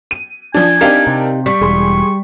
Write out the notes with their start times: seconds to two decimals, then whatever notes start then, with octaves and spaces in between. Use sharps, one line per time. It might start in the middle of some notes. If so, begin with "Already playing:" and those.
0.11 D#7
0.54 F3 D4 G#5
0.81 C4 D4 D#4 G4 A#4 F5
1.07 C3
1.46 G3 C#6 B6
1.61 E1 G#4 C6